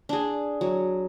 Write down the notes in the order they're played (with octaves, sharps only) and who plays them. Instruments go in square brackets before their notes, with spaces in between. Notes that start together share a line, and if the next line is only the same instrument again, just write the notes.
[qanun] D4 G#4
F#3